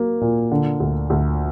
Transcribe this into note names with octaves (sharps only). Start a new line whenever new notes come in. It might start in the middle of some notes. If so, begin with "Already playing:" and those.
Already playing: F#3 A#3
A#2
D3
D2
D2